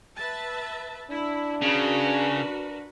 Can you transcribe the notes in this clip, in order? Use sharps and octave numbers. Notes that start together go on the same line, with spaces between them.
B4 E5 A5
D4 E4
C#3 F#4 A#4 B4